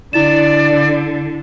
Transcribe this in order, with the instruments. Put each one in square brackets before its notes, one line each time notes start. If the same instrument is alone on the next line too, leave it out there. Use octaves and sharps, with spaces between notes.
[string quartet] D3 [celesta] E4 A6 E7 [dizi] D5